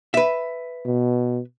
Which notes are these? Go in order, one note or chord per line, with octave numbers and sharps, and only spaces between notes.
B4 E5
B2